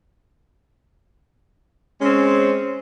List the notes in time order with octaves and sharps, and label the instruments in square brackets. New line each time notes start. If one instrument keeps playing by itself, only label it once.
[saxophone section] G#3 C4 C#4